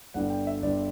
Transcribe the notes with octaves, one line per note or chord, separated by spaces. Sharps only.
G1 G2 D3 F#5
G5
E5
G1 G2 D3 D5